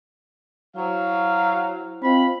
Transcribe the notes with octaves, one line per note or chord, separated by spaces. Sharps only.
F#3 E4 C5 F5
C4 F4 D#5 F5 B5